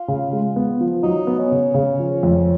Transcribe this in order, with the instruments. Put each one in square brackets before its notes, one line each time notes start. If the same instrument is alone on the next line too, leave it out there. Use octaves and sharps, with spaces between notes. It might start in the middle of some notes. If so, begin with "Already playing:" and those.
Already playing: [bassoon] F4
[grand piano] C#3
G#3
B3
F3
[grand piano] F#3 [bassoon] D#4
[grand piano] B3
[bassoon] C#4
[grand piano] C#3
C#3
F3
F2